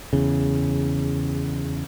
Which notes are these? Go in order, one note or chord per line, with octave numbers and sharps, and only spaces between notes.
E2 C#3